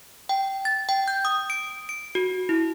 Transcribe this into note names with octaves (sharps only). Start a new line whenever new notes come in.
G5
A6
G5
G6
D#6
D7
D7
F#4
E4